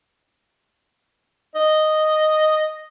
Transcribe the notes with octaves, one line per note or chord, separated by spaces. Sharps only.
D#5